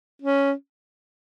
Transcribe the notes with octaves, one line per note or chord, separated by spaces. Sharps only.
C#4